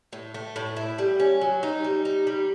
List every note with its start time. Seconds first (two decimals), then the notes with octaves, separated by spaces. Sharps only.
0.13 A2
0.34 A3
0.56 A2
0.76 E4
0.98 G3
1.20 C#4
1.41 F#3
1.63 D#4
1.84 G3
2.05 D#4
2.27 G3